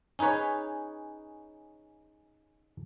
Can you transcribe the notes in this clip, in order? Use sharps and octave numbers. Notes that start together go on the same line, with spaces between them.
C#4 D#4 G#4 B4 C#5